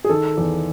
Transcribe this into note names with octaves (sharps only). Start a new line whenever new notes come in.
G#4
D#3 A4
E2